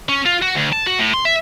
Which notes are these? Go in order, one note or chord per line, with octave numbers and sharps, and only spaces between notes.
C#4
F4
F#4
D2
A5
F#4
A2
C6
E5